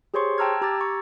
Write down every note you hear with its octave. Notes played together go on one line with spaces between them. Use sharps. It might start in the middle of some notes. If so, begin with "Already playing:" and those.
G4 G#4 C5 C#5 C6 C#6
G5 A5 A#5 E6 F6 G#6
G4 A#5 D6 E6 G#6 A6
C#6